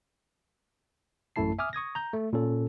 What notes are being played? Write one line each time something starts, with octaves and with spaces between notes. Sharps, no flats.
A1 F#2 A3 E4 A5 C7
E5 G#5 D6 D#6 F6
C#6 D#6 G#6 A#6
A#5 G6
A3
A#2 C#4 A4